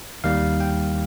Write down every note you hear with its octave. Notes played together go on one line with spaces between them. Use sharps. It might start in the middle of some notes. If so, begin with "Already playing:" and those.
D#2 D#3 G3 A#3 F5
G5